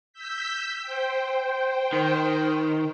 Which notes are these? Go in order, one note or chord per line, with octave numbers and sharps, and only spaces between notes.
E6 G6 B6
C5 G5
D#3